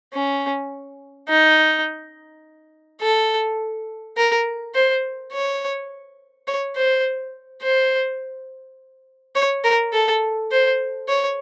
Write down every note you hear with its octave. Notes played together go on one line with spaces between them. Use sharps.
C#4
D#4
A4
A#4
C5
C#5
C#5
C5
C5
C#5
A#4
A4
C5
C#5